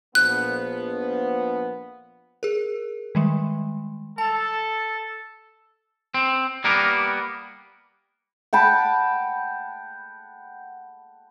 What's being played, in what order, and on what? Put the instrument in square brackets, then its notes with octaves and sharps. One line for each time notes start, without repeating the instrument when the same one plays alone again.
[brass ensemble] A#1 F3 B3 [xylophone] F#6
[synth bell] G#4 A#4
D#3 G3 G#3
[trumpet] A4 [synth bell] A5
[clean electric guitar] C4
G3 A#3 B3 A#4
[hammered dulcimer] F#5 G5 A5 B5